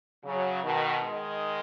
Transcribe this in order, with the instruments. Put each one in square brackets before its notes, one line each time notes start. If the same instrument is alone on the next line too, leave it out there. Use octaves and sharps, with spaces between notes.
[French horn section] C#3 F#3
B2 D#3
D#3 G#3